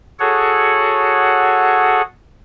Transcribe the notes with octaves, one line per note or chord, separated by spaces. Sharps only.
F#4 G#4 A4 C#5 F#5